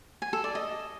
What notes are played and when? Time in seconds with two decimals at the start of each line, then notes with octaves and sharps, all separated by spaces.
0.22 G#5
0.33 A4
0.44 D5
0.55 D#5